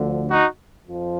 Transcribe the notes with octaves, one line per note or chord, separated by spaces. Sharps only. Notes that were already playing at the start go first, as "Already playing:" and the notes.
Already playing: D2 D3 F3
D#4 F#4
F2 F3